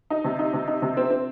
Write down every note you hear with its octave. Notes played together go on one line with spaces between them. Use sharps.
D#4
C3
D#4
C3
D#4
C3
C4
C4